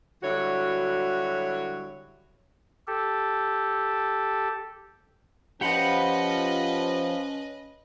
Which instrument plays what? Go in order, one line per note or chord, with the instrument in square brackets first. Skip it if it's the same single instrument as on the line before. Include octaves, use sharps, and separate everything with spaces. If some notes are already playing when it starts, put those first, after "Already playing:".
[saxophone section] D3 F#3 G3 E4 F#4 C#5
[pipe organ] G4 A4
[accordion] F3 [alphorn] C#4 [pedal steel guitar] G4 F#5 B5 [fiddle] B4 D#5